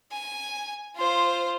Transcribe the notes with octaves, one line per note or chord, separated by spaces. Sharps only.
G#5
F4 C5